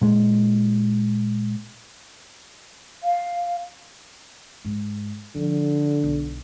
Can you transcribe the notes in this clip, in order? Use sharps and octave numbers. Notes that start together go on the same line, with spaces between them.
A#2 G#3
F5
G#2
D3 F3
B1 B2